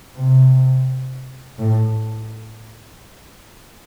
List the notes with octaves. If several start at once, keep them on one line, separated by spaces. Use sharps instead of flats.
C3
A2